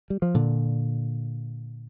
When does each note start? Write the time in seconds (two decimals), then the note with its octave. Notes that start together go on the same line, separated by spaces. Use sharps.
0.10 G3
0.22 F3
0.34 A#2 D3